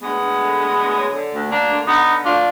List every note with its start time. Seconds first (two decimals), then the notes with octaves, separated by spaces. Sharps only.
0.02 D2 G#3 B3
0.20 D2
0.39 D3
0.58 D2
0.77 D2
0.95 F#3
1.13 D3
1.32 D2
1.50 D2 A#3 D4
1.69 D3
1.87 D3 B3 D#4
2.07 D3
2.25 D2 D4 F4